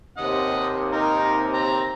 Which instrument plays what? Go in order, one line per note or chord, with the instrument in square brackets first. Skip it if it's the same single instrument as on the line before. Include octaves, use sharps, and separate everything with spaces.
[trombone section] D#2 C3 [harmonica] D#5 F#5
[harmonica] D#4 A#4
C4 A#5